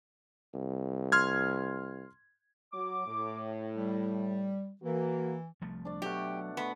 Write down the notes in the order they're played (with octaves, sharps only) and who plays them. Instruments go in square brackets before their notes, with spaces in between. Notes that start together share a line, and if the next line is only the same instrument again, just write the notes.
[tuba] C2
[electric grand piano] C6 F6 G#6
[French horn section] F#3 [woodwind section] D6
[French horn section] A2
[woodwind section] G3
[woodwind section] E3 [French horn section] A#3 F#4
[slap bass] C2 F3 A3
[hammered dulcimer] D4 D5
[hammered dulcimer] B2 A3 F#5 [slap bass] F#3 [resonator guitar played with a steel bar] G4
[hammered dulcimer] A3 A5 [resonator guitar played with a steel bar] B3